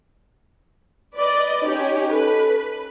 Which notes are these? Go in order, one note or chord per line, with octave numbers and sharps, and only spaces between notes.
B4 D5 D#5
C#4 D#4 G4
A4 B4